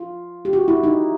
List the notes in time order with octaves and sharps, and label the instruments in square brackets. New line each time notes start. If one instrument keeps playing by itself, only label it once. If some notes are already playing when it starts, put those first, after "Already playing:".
Already playing: [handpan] F4
G4
F#4
E4
D#4